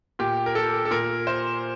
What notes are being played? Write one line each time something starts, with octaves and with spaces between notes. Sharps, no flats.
A#2 G4
A#4
A4
A4
A#2 A#4
C5